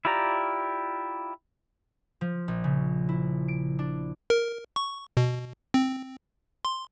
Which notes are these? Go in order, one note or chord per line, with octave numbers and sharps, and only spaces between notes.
E4 F4 G4 D5 A#5
F3
A#1
C#3
E4
D7
D4
A#4
C#6
B2
C4
C6